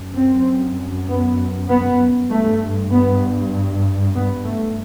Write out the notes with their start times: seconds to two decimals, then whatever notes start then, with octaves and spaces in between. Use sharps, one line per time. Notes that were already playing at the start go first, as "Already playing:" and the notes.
Already playing: F#2
0.15 C4
1.08 B3
1.69 B3
2.30 G2 A3
2.91 B3
4.14 B3
4.45 A3